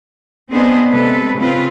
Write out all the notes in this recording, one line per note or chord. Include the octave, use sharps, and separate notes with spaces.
B3 C4 D4 G#4 C5 D#5
C3 G#3 A4 B4
C#3 C4 F4 B4